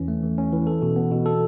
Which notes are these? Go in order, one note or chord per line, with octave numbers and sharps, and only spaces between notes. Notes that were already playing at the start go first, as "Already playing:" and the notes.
Already playing: E2 E3 C#4
A3
E3
C#4
E3
A4
B2
B3
B2
A4